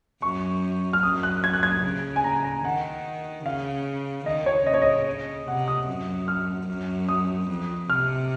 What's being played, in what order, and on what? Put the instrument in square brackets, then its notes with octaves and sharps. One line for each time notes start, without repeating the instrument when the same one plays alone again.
[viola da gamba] F#2 [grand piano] C#6
[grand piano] F6
[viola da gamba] F#2 [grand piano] D#6
[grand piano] F#6
G#6
F#6
G#6
[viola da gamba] C#3
[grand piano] G#5
A#5
A#5
[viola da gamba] D#3 [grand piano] F#5
[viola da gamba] C#3 [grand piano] F5
[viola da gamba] D#3 [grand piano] D#5
[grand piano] C#5
[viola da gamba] C#3 [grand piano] D#5
[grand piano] C#5
D#5
[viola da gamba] C3 [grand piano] F#5
[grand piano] D#6
[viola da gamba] F#2
[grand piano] F6
[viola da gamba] F#2
[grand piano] D#6
[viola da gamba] F2
[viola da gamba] C3 [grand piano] F6